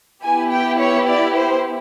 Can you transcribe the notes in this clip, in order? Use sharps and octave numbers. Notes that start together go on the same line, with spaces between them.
B3 E4 G4 G#5
G5
C#5
D5
C5